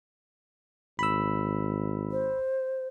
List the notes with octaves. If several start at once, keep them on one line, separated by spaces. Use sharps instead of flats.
G#1 B5 E6
C5